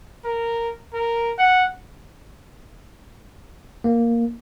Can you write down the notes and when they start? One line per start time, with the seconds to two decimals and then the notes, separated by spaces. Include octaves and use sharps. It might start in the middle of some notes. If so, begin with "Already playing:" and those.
0.24 A#4
0.93 A#4
1.38 F#5
3.84 A#3